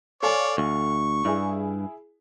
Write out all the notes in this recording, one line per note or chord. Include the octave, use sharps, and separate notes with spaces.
A4 C#5 D5 F5 G#5
D2 C#6
G2 E4 G#4